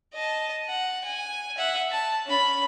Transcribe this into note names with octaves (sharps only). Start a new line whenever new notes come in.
D#5 A5
F#5
G#5
E5 F#5
A5
C#4 B5